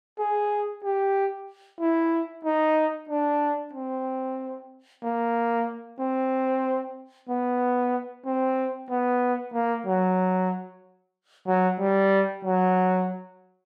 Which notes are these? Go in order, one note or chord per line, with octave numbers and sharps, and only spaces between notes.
G#4
G4
E4
D#4
D4
C4
A#3
C4
B3
C4
B3
A#3
F#3
F#3
G3
F#3